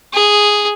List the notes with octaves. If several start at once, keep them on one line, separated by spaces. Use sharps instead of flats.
G#4